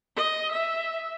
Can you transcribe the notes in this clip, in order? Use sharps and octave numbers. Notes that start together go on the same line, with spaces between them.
D#5
E5